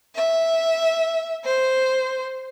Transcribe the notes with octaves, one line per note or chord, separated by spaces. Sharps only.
E5
C5